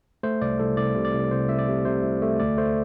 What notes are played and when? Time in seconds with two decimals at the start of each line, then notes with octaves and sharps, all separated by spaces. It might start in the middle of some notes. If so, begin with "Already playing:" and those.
0.23 A3 C5
0.41 C2 D5
0.59 C2 A4
0.77 C2 D5
0.96 C3
1.05 D5
1.13 C2
1.31 C2 C5
1.49 C2 E5
1.59 D5
1.68 C3
1.85 C3 C5
2.04 C2
2.22 A3
2.40 D2 D5
2.57 A3 C5